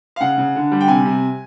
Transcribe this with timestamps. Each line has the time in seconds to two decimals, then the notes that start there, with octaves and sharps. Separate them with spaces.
0.16 F5
0.21 C#3 F#5
0.38 C#3
0.56 D3
0.72 G3
0.81 G5
0.88 C3 G#5
1.05 C3